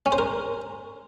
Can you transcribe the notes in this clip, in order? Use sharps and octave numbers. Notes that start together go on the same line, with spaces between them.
C#4
C5
A#4